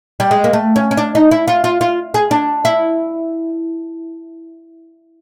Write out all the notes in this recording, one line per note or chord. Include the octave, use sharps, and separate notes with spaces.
G3
G#3
A#3
A3
C#4
C#4
D4
D#4
E4
F4
F4
F4
G#4
D4
E4